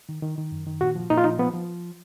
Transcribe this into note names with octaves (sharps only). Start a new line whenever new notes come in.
D#3
D#3
D#3
F#2
D#3
A#2 F#4
F3
A#2 D#4
F4
F3 D#4
F3 B3
F3